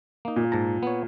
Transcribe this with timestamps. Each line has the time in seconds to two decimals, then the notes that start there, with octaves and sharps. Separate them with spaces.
0.25 A#3 D#4
0.36 A#2
0.52 G#2 A5 A#5
0.83 B3 C#5